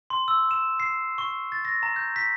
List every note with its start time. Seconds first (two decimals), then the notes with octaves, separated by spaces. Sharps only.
0.10 C6
0.28 E6
0.51 E7
0.80 C7
1.18 C#6
1.52 A6
1.65 A#6
1.83 A#5
1.96 G6
2.16 B6